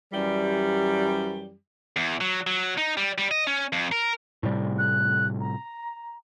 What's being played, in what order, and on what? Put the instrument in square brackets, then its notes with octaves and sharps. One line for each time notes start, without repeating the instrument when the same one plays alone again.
[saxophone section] F#2 E3 G3
[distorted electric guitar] E2
F#3
F#3
D#4
G3
G3
D#5
C#4
F2
A#4
[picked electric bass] A2 C3 G3
[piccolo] F#6
A#5